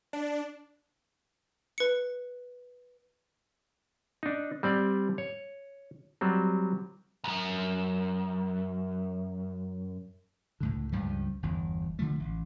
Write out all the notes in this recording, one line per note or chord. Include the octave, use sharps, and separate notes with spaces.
D4
B4 C#7
D4 D#4
G3 C4 D5
C#5
F#3 G3 C4
B1 F#2
C#2 A2 D3
C#2 G2 F3 G3
G1 E2
D3 E3 F3 A3
A1